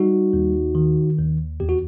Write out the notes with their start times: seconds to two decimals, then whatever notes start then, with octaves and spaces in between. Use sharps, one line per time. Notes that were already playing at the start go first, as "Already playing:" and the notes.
Already playing: G3 D#4 F#4
0.33 D#2
0.75 D#3
1.18 D#2
1.60 E2 G4
1.69 F#4